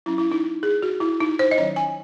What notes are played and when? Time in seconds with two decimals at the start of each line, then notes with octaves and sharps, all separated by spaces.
0.06 F#3 C#4 E4
0.18 E4
0.32 D#4
0.63 G#4
0.82 F#4
1.00 E4
1.20 D#4
1.39 C5
1.51 D#5
1.58 D#3 F#3 C#4 C#5
1.76 G#5